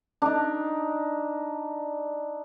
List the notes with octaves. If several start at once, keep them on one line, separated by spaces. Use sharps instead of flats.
D4 D#4